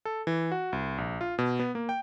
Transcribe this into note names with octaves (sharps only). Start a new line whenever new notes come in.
A4
E3
F#4
C2
A#1
F4
B2
B3
A#3
G5